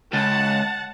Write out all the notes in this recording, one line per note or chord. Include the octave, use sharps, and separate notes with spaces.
C#2 F#5 A5